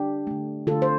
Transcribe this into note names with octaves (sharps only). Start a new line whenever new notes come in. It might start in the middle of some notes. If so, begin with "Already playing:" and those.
Already playing: D4 G4
D3 A3
D3 A3 F4 A4
C5